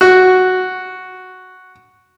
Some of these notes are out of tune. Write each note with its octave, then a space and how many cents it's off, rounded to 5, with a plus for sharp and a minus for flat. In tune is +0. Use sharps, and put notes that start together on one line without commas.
F#4 +0